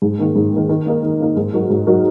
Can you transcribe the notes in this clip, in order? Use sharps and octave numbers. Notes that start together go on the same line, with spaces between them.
G#2
D#3 A#3
G#2
D#3 A#3
D#3
A#3 D#4 A#4
D#3
A#3 D#4 A#4
G#2
F#3 D#4 F#4 A#4
G#2
F#3 D#4 F#4 A#4